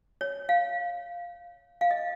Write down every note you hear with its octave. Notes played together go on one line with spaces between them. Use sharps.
C#5
F5
F5
D#5